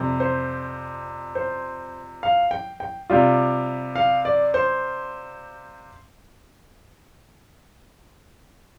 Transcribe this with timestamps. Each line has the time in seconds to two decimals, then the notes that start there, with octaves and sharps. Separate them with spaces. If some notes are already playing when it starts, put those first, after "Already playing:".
Already playing: F2 C3 G3
0.20 C5
1.35 C5
2.23 F5
2.51 G5
2.80 G5
3.10 C3 G3 F4
3.96 F5
4.25 D5
4.54 C5